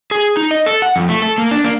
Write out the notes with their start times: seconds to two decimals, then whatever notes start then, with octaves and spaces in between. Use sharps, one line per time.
0.11 G#4
0.37 D#4
0.51 D#5
0.66 A4
0.82 F#5
0.96 F2
1.09 A3
1.22 A4
1.38 A#3
1.51 D4
1.64 A#3